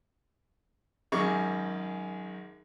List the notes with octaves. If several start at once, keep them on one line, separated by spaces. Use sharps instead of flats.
G#1 F#2 G#4 C#6 D6